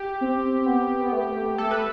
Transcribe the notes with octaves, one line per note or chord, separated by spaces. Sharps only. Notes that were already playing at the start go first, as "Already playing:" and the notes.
Already playing: G4
C4
B3
B3
A3
A3 A4
B4